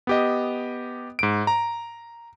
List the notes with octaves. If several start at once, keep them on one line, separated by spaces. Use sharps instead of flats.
B3 G4 D#5
G#2 D7
A#5